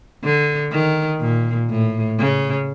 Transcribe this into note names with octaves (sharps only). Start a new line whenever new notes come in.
D3
D#3
A#2
A2
C#3